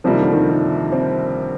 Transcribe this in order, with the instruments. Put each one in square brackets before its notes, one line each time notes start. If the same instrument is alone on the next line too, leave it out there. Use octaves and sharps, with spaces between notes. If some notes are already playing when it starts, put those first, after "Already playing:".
[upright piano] C2 C3 G3 A#3 [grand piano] F3
[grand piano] D#3
D3
D#3
D#3
C4